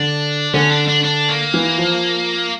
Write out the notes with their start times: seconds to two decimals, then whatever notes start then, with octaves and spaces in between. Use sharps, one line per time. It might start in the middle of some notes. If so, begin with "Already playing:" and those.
Already playing: D3 D4
0.54 D3 C#4
0.71 D4
0.87 D4
1.03 D4
1.29 A#3
1.54 E3
1.78 F3